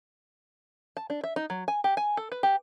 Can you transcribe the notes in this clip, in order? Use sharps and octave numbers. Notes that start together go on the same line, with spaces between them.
A5
D4
E5
D#4
F#3
G#5
G4
G#5
A4
B4
G4